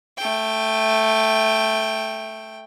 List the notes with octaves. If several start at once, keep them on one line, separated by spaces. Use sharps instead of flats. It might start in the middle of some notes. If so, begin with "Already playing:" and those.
A3 G5